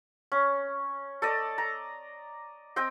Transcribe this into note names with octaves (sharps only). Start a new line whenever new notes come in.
C#4
A4 D5 D#5
A#5
C4 D#5 G5